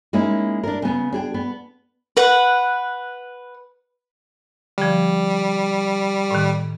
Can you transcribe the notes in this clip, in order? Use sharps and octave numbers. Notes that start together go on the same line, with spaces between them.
G#3 A#3 C#4 D#4 E4
D4 A#4
C#3 B3
D4 G#4 G5
B3
B4 F#5
D3 F3 G3
A2 D#3